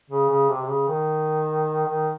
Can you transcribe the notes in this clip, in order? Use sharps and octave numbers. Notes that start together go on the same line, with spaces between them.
C#3
C#3
C3
C3
C#3
D#3
D#3